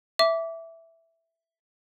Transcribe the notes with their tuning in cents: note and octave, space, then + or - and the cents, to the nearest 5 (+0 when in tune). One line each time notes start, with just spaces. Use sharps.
E5 +0 D6 -20